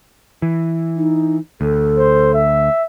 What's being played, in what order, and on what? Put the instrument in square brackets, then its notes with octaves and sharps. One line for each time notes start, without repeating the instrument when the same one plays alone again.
[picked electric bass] E3
[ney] D#4
[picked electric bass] D2 [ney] A4
[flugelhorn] C5
E5